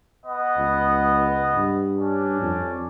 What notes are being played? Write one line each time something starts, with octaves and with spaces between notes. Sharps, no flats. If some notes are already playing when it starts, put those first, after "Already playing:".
B3 D#5 F#5
C#2
G2
C#4 D4 D5
F2